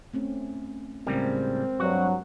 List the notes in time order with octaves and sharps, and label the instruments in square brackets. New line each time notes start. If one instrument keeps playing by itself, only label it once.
[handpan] A3 C4 C#4
[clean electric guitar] A2 C#3 G3 [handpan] G#3 A#4 [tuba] C4
[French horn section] G2 F#3 [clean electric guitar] F#4